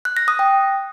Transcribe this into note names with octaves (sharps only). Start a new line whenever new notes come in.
F#6
A#6
D#6
G5